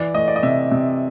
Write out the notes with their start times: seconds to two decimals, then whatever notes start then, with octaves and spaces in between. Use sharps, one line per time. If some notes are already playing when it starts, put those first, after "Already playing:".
Already playing: E3 D5
0.14 A3 D#5
0.28 D5
0.36 D#5
0.43 C3 E5
0.72 C3